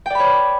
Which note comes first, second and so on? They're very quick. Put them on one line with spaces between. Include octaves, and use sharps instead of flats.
G5 D5 B5 C#5